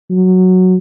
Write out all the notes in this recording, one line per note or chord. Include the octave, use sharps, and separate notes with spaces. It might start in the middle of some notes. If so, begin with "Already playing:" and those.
F#3